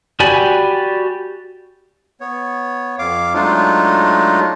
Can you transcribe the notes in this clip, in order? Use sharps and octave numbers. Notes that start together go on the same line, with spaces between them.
F#4 G4 D5 G#5 B5
B3 C#5
F2 F5 D6
F#3 G#3 A3 D4 D#4 F4